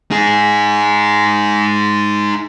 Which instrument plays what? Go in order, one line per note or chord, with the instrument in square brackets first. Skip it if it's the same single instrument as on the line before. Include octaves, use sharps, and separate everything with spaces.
[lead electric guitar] D#4 G#4